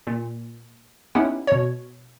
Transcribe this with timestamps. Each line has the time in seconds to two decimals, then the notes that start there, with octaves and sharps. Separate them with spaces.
0.07 A#2
1.15 B3 C#4 D#4 E4 G4 F#5
1.47 B2 C#5